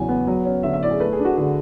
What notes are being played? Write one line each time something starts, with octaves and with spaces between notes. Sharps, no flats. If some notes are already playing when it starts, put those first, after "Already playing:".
Already playing: E2 C#3 F#3 G#5
B3
F#3
C#4
D3 E5
E5
E4 D5
G#4
A3 B4
G#4
D4
F#4
D3 G#4